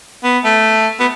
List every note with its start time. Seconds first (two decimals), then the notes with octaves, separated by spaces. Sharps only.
0.24 B3
0.44 A3
1.00 B3